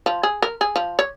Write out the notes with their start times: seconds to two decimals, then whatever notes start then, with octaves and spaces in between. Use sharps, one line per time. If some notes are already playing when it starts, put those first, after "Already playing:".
0.06 F3
0.23 G#4
0.42 A#4
0.61 G#4
0.76 F3
0.99 C#5